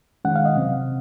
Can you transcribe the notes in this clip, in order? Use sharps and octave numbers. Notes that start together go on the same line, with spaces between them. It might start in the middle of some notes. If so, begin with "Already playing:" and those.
D#3 G#3 C#4 F#5
F5
D#5
C3 F#3 C4